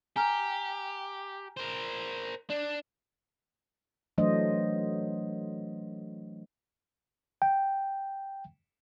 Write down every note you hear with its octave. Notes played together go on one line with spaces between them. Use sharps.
G4 G#5 A#5 F6
A#4 C5
D4 D5
E3 F#3 A3 D4 C5 D#5
G5